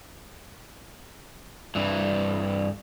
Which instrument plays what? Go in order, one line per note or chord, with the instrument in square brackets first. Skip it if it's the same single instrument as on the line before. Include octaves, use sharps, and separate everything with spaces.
[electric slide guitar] G2 E3